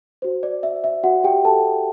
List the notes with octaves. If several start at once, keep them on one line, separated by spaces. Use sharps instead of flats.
F#4 C5
D5
E5
E5
F#4 F#5
G4 G5
A4 A5